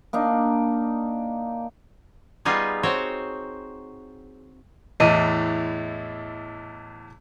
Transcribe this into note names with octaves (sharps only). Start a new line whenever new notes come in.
A#3 D4 D#4
G3 B3 D#4 F4 G#4
C4 F#4 C5 C#5
E2 A2 E3 D#5